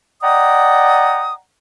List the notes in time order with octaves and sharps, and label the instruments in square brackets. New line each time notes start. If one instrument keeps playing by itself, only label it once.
[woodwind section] D5 D#5 F#5 G5 A#5 D#6